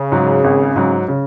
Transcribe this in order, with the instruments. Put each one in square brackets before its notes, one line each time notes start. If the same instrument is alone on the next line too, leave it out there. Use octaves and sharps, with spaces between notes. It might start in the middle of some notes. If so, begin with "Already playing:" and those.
Already playing: [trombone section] C#3
[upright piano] G#2 F#3
G#1
G#2 F#3
C#3